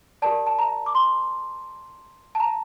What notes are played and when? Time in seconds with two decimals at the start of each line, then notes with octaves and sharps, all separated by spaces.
0.22 G4 A#4 D5 A5
0.47 A5
0.59 A#5
0.86 D6
0.95 C6
2.35 A5
2.40 A#5